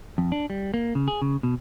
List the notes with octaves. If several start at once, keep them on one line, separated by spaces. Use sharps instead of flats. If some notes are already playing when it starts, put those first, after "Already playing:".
F2
D4
G3
A#3
C#3
G#4
C#3
B2